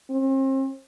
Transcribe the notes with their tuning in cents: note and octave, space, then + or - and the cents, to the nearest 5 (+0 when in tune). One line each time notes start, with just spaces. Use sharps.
C4 +40